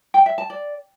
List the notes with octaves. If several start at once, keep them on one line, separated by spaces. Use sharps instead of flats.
G5
E5
A5
D5